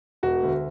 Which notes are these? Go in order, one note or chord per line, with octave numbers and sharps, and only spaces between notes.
E1 F#4
D2